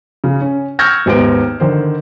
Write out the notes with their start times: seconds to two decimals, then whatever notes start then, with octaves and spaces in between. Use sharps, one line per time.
0.24 C#3
0.41 C#4
0.79 C#6 E6 F6 G6 G#6 A#6
1.06 G#1 D#2 B3 D7
1.60 D3 D#3 C5